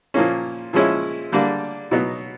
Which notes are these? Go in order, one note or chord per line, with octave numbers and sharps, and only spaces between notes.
A#2 F3 A#3 C#4
A#2 F3 G#3 C#4 E4
D3 G3 A#3 D4
B2 F#3 B3 D#4